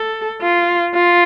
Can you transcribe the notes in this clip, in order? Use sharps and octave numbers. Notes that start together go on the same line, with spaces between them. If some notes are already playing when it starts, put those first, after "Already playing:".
Already playing: A4
F4
F4